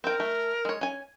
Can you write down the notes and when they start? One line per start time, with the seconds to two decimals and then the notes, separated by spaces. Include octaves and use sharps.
0.04 C4 A#4 G5
0.20 A3
0.65 G#3 C#5
0.81 C#4 G#5